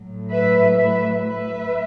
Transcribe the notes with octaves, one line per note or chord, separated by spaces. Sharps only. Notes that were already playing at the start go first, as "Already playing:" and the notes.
Already playing: A2 F#3 A3
B4 E5
B4 E5
B4 E5